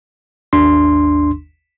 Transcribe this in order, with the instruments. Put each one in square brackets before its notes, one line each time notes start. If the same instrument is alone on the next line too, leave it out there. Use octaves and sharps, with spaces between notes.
[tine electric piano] G#1 D#2 D4 C6